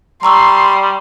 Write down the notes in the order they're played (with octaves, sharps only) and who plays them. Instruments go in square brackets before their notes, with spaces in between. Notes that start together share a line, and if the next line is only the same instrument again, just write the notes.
[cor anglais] G3 [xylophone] A#5 C#6 E6 [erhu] C6